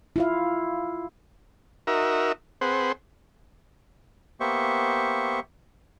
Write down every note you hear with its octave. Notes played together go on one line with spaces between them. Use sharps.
E4 F4 F5
D#4 F#4 A#4 E5
C4 G#4 B4 C5 F#5
A#3 B3 G4 C5 E5 C#6